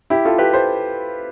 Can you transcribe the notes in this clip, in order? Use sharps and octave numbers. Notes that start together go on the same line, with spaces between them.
E4 G4
F4 A4
G4 B4
A4 C5